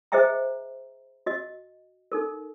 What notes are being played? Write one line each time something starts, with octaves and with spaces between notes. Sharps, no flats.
G#4 C5 D#5 E5 G5 A#5
F#4 D#5
D#4 A4 A#4